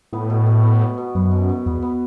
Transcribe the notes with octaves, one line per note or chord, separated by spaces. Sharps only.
A2 B3
B2
B2
B3
B3
B2
F#2 B3
B2
B2
E2 B3
B3